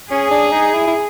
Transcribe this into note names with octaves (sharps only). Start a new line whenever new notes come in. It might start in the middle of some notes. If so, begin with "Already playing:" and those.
C#4 G#4
D4
D#4
E4
E4